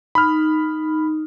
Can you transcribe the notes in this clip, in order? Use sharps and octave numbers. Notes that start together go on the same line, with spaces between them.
D#4 B5 F6